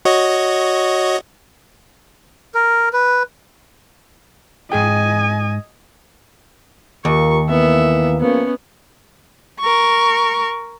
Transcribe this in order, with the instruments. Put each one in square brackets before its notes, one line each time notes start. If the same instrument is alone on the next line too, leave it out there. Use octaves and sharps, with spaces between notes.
[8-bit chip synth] F#4 C#5 D#5
[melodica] A#4
B4
[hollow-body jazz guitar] G#2 G#4 G5 [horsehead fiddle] D#5 G#5
[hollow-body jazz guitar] D#2 [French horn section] F4 G4 A#4 [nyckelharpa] C#6
[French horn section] E3 A#3 [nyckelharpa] B3 E5
[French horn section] G#2 F3 A#3 [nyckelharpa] B3 C#4
[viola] A#4 C#6